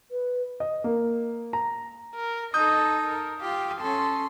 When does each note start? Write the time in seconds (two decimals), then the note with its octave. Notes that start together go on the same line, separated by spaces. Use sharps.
0.11 B4
0.60 D#5
0.84 A#3
1.53 A#5
2.15 A#4
2.54 D#4 A4 D#5 D#6 G6
3.04 A#4
3.41 F4 G4 F5
3.81 C#4 A4 C6